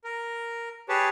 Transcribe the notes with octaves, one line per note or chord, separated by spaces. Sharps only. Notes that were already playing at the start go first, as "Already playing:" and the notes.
A#4
G4 G#4 B4 C#5 A5